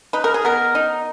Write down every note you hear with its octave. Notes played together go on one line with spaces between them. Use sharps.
D#4 B4
A#4
G#4
B3 A#4
D#4